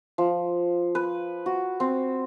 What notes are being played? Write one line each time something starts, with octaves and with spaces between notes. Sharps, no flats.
F3
B4
F#4
C4